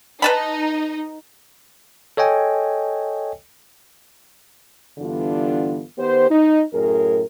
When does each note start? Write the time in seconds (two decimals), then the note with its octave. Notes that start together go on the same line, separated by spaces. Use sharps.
0.22 D#4 B4 A5 B5
2.17 A4 C#5 D#5 G5 G#5
4.98 G2 D3 E3 B3 D4 F4
5.98 D#3 B3 G4 C5
6.30 D#4
6.73 F#2 A2 G#4 A#4